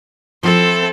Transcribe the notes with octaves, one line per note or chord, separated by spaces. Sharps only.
F3 C4 E4 A4